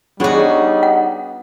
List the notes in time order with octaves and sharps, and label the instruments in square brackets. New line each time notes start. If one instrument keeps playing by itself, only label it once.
[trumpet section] G3 D#4 [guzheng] B3 F#4 [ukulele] D4 G#4 C#5
[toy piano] F#5